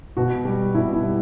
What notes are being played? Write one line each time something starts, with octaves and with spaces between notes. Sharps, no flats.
B2 F#4
G3
B2 E4
E4
G3